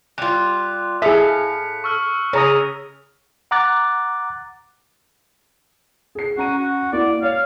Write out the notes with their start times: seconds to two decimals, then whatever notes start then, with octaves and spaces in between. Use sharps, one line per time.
0.18 G3 F4 F#6
1.02 A2 G#4 E5 F5 B6 C#7
1.84 C#6 E6 F6
2.33 C#3 C#5 A#5 D#6
3.51 F#5 A#5 D6 F#6 A6
6.15 G#4 C7
6.37 C#4 F#4 A#5 D#7
6.58 F#4
6.93 A#3 E4 F#4 D5
7.22 C#5 F5